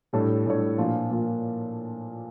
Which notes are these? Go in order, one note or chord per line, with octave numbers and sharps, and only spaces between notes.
A2 G3 D4 A4 C#5
A2 G3 D4 A4 C#5
A#2 F3 A#3 D4 F4
A#2 F3 A#3 F4